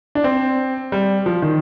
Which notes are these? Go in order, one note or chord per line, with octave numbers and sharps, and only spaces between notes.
D4
C4
G3
F3
D#3